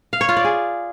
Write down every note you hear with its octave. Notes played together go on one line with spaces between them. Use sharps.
F5
C#5
F4
D5
G#4